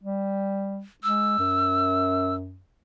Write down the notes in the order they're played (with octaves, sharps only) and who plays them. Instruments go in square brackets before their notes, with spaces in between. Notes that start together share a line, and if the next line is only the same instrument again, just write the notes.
[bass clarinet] G3
[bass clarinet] G#3 [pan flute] E6
[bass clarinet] F#2